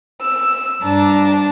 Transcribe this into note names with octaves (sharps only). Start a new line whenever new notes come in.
E6
G2 D4 A5 A#5